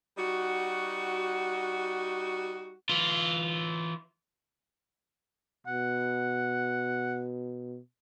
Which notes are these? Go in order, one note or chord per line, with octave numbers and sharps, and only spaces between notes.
G3 D#4 F#4
E3 F4
B2 F#5